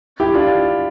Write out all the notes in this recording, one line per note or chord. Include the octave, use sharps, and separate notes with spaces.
E4 G4
D4 F4